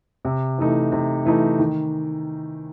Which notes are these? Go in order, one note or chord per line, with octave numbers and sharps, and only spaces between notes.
C3
E3 A3 D#4
C3
E3 A3 D#4
D#3